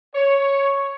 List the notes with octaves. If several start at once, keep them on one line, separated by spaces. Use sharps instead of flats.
C#5